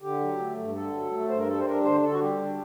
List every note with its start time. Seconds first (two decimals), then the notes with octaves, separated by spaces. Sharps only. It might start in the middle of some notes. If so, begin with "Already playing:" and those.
0.02 D3 G4
0.20 F#3
0.39 A3
0.57 G2
0.74 D3 A4
0.93 F#3
1.12 A3
1.29 G2 C5
1.38 A#4
1.47 G3 A4
1.59 C5
1.66 D4 A#4
1.84 D3 C5
2.02 D3 A4
2.12 F#4
2.21 G3 G4
2.38 D4